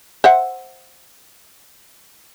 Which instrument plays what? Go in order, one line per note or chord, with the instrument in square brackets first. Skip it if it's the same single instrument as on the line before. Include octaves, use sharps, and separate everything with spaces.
[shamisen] C5 E5 F#5